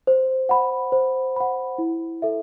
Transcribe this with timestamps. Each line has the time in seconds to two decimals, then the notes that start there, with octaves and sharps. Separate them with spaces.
0.07 C5
0.49 F#5 B5
0.92 C5
1.36 F#5 B5
1.78 E4
2.22 A4 E5